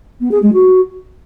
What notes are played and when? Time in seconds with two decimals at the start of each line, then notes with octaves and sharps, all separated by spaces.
0.20 B3
0.31 G#4
0.42 G#3
0.53 F#4